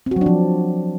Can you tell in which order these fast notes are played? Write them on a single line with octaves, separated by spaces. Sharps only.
C4 F#4 F#3 D4 F3